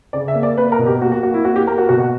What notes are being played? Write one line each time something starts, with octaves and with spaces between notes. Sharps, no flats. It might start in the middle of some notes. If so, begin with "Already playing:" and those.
C#3 D5
E5
A#3
D5
A#3 B4
A#4
B2
G4
A#3 F#4
F#4
A#3 F#4
E4
A#3 F#4
G4
A#3 A#4
F#4
B2 F#4
F#4